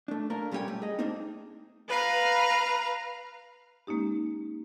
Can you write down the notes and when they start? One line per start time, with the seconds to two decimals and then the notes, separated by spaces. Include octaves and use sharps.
0.08 A3 D4
0.30 A3 A#3 D4 A#4
0.52 A#2 G3 C#4 D4 C#5 G5
0.68 A3
0.82 G#4 D#5
0.99 A3 A#3 C4 D4 D#4
1.88 B4 F5 A#5
3.87 G#3 A#3 C#4 D#4 G4